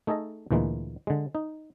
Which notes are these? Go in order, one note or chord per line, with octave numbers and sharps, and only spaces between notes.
A3 D#4 G#4 A4 D#5
D2 A#2 E3 G#3 A#3
D3 G#3
D#4